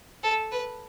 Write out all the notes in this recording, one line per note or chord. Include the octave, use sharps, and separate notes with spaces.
A4
B4